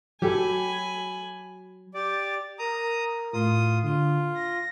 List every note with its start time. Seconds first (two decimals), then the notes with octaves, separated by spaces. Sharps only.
0.22 F#3 G4 A4 G#5 B5
1.94 G4 D5 A6
2.59 A#4 A#5 D#6
3.33 A2 F4 D#6
3.83 D3 F4
4.34 A#6